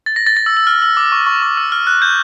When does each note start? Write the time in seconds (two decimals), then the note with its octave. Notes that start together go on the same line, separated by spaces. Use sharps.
0.06 A6
0.16 A#6
0.27 A6
0.37 A6
0.46 E6
0.57 E6
0.67 F6
0.82 E6
0.97 D6
1.12 C#6
1.27 C#6
1.42 D6
1.57 E6
1.72 F6
1.87 F#6
2.02 G6